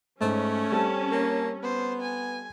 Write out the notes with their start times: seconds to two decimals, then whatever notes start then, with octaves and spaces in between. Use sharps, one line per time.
0.21 G#2 A3 C#4
0.72 G3 C4 A4 A5
1.11 A#3
1.63 B3 C5
2.01 G#5